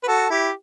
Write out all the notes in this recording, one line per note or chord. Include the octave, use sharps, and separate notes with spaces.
B4
F#4 A4
E4 G4